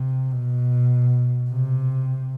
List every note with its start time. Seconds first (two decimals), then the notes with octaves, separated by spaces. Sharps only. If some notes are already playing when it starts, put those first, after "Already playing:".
Already playing: C3
0.32 B2
1.50 C3